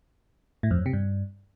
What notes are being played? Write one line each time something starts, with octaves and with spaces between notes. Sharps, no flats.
A2
F2
F#2
C3
G2